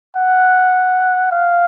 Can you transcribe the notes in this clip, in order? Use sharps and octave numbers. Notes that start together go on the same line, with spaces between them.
F#5
F5